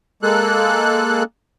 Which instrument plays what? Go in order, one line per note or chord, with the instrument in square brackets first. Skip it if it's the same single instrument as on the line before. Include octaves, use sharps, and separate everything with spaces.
[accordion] G#3 A#3 A4 F#6